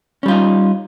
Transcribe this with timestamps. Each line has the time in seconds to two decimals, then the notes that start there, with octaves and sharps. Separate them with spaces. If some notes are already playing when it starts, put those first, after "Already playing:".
0.23 C#4
0.26 G3
0.28 F4
0.31 D#4